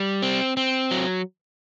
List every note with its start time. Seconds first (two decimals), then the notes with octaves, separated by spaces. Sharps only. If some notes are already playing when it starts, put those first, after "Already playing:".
Already playing: G3
0.22 C4
0.57 C4
0.91 F#3